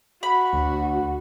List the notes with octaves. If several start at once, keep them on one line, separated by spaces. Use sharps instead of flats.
F#4 B5
D2